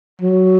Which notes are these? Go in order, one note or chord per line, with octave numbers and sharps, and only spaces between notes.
F#3